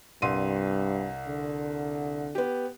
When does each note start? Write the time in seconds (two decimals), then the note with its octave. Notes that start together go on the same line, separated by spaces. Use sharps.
0.22 C2 G2 C6 D#7
1.27 D3
2.35 B3 G4